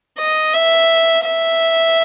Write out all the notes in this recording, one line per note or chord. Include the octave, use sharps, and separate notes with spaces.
D#5
E5
E5